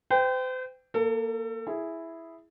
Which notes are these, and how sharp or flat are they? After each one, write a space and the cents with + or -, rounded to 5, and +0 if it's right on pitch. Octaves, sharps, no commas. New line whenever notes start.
C5 -40 G5 +0
A#3 +0 A4 +30
E4 +0 G#4 +0